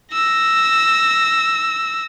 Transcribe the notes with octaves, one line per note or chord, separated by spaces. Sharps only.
E6 A#6